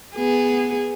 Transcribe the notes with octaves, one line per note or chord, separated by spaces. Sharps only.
B3 G#4